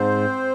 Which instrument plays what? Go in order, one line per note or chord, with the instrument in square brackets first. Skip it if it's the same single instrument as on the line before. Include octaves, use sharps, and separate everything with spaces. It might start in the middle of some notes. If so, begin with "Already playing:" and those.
Already playing: [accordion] G#2 C4 C5